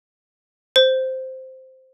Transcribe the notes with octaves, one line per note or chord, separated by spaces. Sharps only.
C5